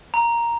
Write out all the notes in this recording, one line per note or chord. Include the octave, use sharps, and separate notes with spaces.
A#5